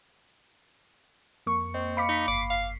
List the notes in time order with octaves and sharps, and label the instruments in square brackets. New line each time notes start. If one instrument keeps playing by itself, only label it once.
[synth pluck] F2 A#3 C#6
[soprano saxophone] C4 [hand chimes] D#5
[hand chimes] F5 B5 [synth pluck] D6 B6 C#7
[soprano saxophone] D#4
[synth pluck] G1 C7 [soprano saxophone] D6
[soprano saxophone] F5